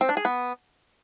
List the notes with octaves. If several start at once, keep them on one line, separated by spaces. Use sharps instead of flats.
C4
D4
G#4
B3